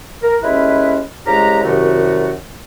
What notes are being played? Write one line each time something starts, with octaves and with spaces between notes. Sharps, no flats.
A#4
D#2 G#3 C#4 E4 B4 E5
C2 C#3 G#3 G4 A#5
C2 F#2 C3 D#3 A3 F#4